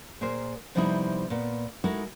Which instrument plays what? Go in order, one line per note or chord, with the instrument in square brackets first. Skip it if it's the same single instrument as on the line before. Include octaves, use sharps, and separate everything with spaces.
[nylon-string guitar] A#2 G#4 A#4 C5
C3 F3 G3 B3 D#4 E4
A#2 B3
G#3 D#4 E4 F#4 A4 A#4